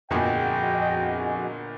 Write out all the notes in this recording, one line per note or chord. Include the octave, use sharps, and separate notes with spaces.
G1 F2 A#2 F#4 G#4 D#5 G5